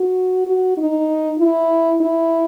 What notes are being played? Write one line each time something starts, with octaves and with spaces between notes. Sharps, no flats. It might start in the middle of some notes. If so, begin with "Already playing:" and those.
Already playing: F#4
F#4
D#4
E4
E4